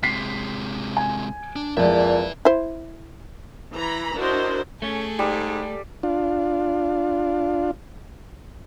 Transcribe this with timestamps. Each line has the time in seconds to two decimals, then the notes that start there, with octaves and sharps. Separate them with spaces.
0.03 C3 G#3 B6 C7
0.97 G#5
1.56 D4
1.77 F2 A#2 G#3 B4 D5 E5 A5
2.45 E4 C5
3.74 E3 A#5 B5
4.17 D4 E4 F#4 A#4 C5 D#5
4.82 A3 C#4 G#4 A4
5.19 G#2 G3
6.03 D4 F4